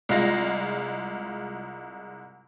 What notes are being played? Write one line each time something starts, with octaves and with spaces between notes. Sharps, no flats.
C2 G#3 F4 A#6